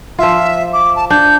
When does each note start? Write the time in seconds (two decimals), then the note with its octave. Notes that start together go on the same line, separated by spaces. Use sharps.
0.19 F3 F4 E5
0.73 D6
0.96 A5
1.10 D4 G6